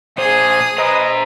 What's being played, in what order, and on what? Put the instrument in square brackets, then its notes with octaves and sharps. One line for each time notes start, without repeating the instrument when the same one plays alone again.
[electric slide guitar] A#2 C5 [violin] G#4 D#6
[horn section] B4 D#5 [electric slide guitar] C5 A#5